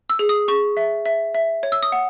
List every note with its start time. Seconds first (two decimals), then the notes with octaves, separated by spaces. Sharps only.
0.10 E6
0.19 G#4
0.29 D#6
0.48 G#4 C#6
0.77 E5
1.06 E5
1.35 E5
1.63 C#5
1.72 E6
1.83 D#6
1.92 F#5